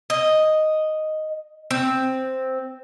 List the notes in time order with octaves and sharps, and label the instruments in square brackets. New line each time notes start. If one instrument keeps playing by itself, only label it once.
[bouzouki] D#5
C4